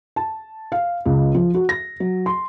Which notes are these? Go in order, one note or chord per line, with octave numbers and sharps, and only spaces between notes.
A5
F5
C#2
F3
F#4
A#6
F#3
C6